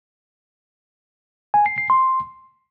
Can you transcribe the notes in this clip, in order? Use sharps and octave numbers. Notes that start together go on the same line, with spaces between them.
G#5
C7
C7
C6